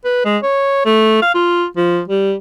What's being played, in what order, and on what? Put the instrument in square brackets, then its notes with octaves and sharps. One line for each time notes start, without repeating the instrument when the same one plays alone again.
[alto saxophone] B4
G#3
C#5
A3
F5
F4
F3
G3